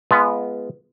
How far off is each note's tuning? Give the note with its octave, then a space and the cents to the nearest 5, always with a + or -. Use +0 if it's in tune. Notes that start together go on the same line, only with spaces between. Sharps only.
G#3 +15 B3 +0 F4 -25